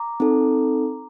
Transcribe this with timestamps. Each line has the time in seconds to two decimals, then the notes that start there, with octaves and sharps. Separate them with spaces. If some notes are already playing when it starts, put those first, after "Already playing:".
Already playing: A#5 D6
0.20 C4 D#4 A4